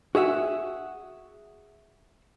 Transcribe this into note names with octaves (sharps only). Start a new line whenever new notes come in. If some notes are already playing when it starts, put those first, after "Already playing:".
F#4 G#4 E5 F#5